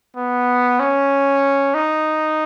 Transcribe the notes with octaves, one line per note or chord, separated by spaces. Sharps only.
B3
C#4
D#4